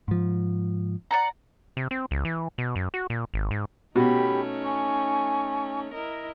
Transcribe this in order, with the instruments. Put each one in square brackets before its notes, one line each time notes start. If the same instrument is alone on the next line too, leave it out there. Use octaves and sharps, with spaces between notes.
[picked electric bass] G#2 F3
[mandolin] D5 F#5 A#5
[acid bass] C3
C4
C#2
E3
B2
F#2
F#4
A#2
G#1
G#2
[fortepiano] B2 [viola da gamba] A3 C#4 D#4 [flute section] G4 B5
[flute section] G#5 C#6
[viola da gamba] E4 A#4 D#5